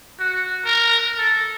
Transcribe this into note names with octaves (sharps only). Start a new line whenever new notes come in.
F#4
A#4
A4